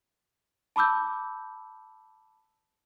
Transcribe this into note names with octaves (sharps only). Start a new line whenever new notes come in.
A5 B5 D6 E6 G6